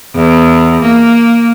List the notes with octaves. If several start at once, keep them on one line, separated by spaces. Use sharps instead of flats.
E2
A#3